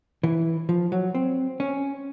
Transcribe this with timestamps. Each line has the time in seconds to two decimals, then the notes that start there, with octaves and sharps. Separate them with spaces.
0.23 E3
0.69 F3
0.92 F#3
1.15 C4
1.60 C#4